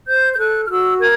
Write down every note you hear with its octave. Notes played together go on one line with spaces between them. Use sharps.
C5 G6
G6
A4 F#6
F6
F#4 E6
A#4 G#6